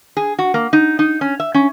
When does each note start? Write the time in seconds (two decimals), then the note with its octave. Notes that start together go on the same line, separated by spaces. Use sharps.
0.17 G#4
0.39 F#4
0.54 A#3
0.73 D#4
0.99 D#4
1.21 C#4
1.40 E5
1.54 C#4